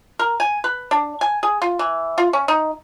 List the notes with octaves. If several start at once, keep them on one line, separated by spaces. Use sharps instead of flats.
A#4
G#5
B4
D4
G#5
G#4
F4
E3
F4
C#4
D#4